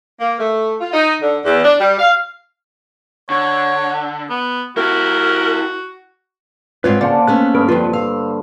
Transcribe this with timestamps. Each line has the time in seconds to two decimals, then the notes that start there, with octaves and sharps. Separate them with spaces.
0.21 A#3
0.39 A3
0.81 F4
0.93 D#4
1.22 D3
1.45 E2
1.65 D4
1.80 G3
1.99 F5
3.30 D3 C#5
4.30 B3
4.77 E4 F#4 G4 A#4
6.84 G#2 C4 F4 B4 C#5
7.01 C#3 A#3 C5 D5 F#5 A5
7.27 A3 B3 C#4 F#6
7.55 G2 D3 A#4
7.68 F2 F3 F4 B4
7.93 F5 E6